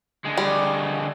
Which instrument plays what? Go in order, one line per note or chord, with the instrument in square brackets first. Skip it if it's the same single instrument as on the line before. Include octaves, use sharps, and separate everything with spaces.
[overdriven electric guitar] D3 G#3
[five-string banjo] G3